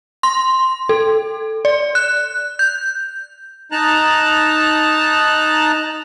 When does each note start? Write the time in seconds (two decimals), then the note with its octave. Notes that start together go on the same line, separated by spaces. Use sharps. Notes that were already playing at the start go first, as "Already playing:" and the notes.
0.23 C6
0.89 A4
1.65 D5
1.95 F#6
2.59 G6
3.72 D#4 A5 A#5 F#6